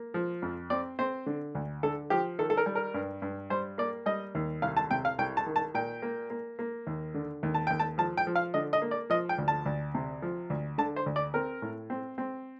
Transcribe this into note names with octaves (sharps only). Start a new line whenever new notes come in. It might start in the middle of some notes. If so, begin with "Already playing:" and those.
Already playing: A#3
F3
F2
C4 D5
C4 C5
D3
D2
D3 A4
F3 G4
D#3 A4
A4
A#4
G3
A#4
G2
G2
G3 C5
A#3 D5
G3 D#5
D#2
C2 F5
A5
C3 G5
F5
C2 G5
A5
D#3
A5
A#2 G5
A#3
A#3
A#3
D#2
D3
D#2
A5
D#2 G5
A5
F3 A5
G5
F3
F5
D3 D#5
D#5
A#3
D5
F3 D#5
G5
D2
A5
D2
C3
F3
D2
D3 A5
C5
D2
D5
C4 A#4
A2
C4
C4